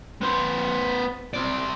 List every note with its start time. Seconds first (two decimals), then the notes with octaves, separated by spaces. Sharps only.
0.22 B3 C5
1.34 C4 D5